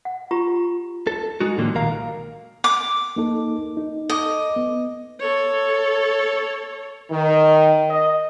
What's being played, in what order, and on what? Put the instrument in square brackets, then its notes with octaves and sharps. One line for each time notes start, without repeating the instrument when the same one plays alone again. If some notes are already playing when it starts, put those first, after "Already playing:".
[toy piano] F#5
F4 G4 A#5 C#6
[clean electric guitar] A4
G#3 D#4 F#4
A2 D3 D#3 F3 G3 A#3
B1 A#2 D#3 A#4 F5 A#5
[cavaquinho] D6
[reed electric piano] A#3 D#4 A4
D#4
[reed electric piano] A4 D6 [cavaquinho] D#5
[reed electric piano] B3
[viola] A4 C#5
[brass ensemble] D#3
D#5